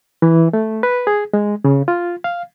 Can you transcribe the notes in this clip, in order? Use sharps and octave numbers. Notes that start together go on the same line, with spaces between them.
E3
A3
B4
G#4
G#3
C#3
F4
F5